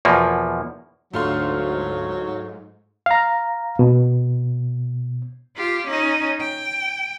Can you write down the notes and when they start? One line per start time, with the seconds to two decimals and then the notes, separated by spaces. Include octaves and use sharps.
0.05 E2 B2 F3 A#3
1.13 D2 G#2 F#3 A3 F4 C6
3.06 F5 A#5
3.79 B2
5.56 F4 G4
5.87 C#4 D#4
6.41 G5